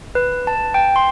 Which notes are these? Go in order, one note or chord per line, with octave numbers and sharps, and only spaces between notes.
B4
A5
G5
C6